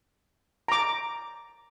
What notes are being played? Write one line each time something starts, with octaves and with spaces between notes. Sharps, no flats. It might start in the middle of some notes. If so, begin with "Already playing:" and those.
A#5 D6